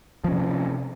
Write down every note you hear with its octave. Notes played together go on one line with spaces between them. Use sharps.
C3 F3 C#4